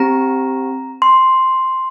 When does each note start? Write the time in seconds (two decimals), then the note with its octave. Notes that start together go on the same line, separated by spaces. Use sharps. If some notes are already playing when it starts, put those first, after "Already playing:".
Already playing: C4 G4 A#5
1.02 C6